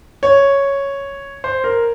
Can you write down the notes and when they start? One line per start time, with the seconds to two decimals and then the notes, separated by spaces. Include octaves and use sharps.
0.23 C#5
1.44 C5
1.64 A#4